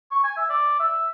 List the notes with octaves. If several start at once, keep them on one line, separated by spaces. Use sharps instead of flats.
C#6
G#5
E5
D5
E5